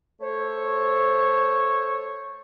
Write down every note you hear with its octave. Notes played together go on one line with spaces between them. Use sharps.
A3 A4 C5 C#5